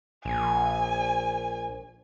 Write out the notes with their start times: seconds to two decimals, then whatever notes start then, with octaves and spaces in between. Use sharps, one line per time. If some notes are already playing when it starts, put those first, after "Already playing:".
0.25 A#1 G#5